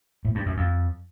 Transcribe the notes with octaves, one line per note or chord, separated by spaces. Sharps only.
A2
G2
F#2
F2